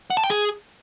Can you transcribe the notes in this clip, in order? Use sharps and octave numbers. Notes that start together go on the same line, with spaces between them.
F#5
A5
G5
G#4